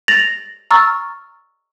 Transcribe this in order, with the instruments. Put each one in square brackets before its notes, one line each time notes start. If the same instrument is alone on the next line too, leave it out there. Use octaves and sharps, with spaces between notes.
[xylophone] A6 A#6 F7 F#7
A#5 C#6 E6 F6 A6